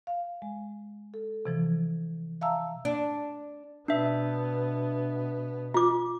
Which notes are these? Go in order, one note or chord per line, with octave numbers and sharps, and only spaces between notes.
F5
G#3
A4
C3 E3 F3
E5 F5 A5 A#5 E6
D4
B2 B3 D4 E5
F4 D6